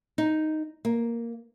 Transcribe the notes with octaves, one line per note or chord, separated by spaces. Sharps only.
D#4
A#3